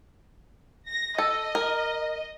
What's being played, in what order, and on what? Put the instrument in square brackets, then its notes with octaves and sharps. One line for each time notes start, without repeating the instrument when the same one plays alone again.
[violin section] A#6
[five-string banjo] A4 [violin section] D#5
[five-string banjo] A#4